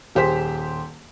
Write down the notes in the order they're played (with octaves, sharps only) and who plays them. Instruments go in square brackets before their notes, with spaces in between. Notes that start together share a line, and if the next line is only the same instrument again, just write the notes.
[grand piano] D#1 G4 G#4 C5 B6